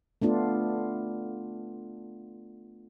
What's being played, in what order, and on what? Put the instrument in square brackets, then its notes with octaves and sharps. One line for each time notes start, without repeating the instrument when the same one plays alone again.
[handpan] A3 B3 D4 F4